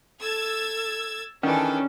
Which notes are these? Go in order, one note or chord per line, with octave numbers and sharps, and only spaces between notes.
A4 E6 G#6 A6
D#3 E3 C#4 D4 G#4 A4